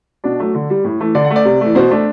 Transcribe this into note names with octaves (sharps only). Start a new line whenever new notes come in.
B2 D4
F#3 A3
D3
G3
A2
E3 A3
D3 D5
F#5
A3
D5
C3
E3 A3
B2 C5
A3 D4